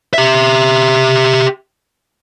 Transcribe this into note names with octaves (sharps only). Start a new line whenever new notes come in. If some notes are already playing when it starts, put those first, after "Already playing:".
G4 E5